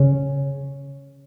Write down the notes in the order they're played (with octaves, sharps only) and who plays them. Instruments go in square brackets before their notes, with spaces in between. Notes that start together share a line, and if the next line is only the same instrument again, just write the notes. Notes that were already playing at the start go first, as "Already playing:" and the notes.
Already playing: [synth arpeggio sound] C#3